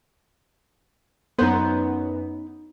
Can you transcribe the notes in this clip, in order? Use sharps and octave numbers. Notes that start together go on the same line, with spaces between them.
F#2 B3 D#4 C5